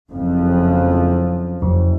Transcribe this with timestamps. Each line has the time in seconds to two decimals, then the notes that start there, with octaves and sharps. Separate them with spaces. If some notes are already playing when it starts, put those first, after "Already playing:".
0.11 F#1 F2 F3
1.62 F#1 F2